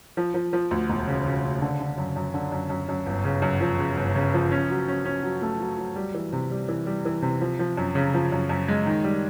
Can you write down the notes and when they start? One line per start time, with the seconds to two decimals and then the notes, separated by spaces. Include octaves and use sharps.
0.17 F3
0.34 F3
0.53 F3
0.71 D2
0.90 E1
1.07 C#3
1.26 C#3
1.44 C#3
1.62 D3
1.80 D3
1.98 F#2
2.16 F#2
2.34 D3
2.52 F#2
2.70 F#2
2.89 F#2
3.06 G1
3.24 C#3
3.42 F#2
3.60 F3
3.78 C#3
3.97 G1
4.15 C#3
4.34 F3
4.51 C#4
4.70 F#3
4.88 C#4
5.05 C#4
5.23 F#3
5.42 A3
5.60 F#3
5.78 F#3
5.96 G3
6.14 E3
6.33 C3
6.51 G3
6.68 E3
6.86 G3
7.05 E3
7.22 C3
7.41 F3
7.59 F3
7.77 F#2
7.95 C#3
8.14 F3
8.32 F#2
8.49 F#2
8.68 G#3
8.86 D#3
9.04 G3